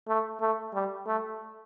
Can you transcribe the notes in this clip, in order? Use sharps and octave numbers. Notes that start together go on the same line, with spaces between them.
A3
A3
G3
A3